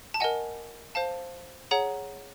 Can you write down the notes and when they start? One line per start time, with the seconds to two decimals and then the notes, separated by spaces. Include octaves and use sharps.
0.14 A5
0.20 A#4 D#5 F#5 G#5
0.95 C5 F5 A5
1.71 G#4 C#5 F#5 A#5